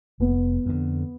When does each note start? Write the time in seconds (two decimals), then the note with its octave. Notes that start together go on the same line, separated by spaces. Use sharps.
0.20 F1 B3
0.66 F2 D3